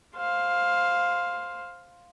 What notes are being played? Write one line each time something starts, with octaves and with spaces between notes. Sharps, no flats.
C5 F5